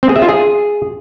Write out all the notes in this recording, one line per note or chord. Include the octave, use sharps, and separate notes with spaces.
C4
G#4
E5
F4
G#4